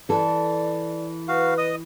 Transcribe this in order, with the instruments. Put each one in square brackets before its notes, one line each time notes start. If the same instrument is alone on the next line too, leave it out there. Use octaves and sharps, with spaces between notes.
[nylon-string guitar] E3 A4 [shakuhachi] D5
[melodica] F#4 F5 [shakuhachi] B4
[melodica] D#5 D#6